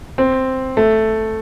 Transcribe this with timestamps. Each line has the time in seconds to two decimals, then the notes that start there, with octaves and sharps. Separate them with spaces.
0.18 C4
0.77 A3